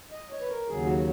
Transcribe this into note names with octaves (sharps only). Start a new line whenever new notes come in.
D#5
C#5
B4
A#4
D#2 C#3 F#3 G#4
F#4